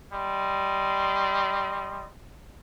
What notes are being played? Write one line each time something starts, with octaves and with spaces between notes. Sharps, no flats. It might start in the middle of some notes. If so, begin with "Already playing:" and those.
G3 D#5 C6